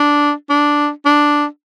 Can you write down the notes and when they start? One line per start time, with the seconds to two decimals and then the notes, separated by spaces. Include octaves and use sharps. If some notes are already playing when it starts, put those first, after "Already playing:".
Already playing: D4
0.50 D4
1.06 D4